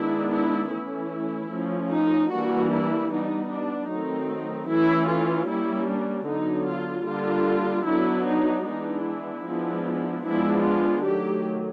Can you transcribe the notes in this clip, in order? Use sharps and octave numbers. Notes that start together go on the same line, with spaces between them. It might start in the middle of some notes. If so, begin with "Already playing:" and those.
Already playing: D#3 G#3 B3 D4 E4
E4
E3 A3 C#4 E4
F3 A3 C#4
D#4
E3 G3 A#3 D4 F#4
E4
G3 B3 D4 D#4
D4
D#3 F#3 A3 C4 D#4
E3 A3 C#4 E4
F4
G3 A#3 C#4 E4
D4
D3 F#3 B3 D4 D#4
F4
D3 G3 A#3 D4 F4
F#3 B3 D4 E4
D#4
E3 G#3 B3 D4 D#4
E4
F3 G#3 B3 D4
F3 G#3 B3 D4 E4
F4
D#3 F#3 A3 G4